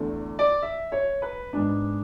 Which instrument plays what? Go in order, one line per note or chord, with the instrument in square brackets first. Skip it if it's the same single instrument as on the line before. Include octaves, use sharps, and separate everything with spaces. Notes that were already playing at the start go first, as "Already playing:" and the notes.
Already playing: [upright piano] E2 D3 A3
D5
E5
C#5
B4
G#2 G#3 B3 D4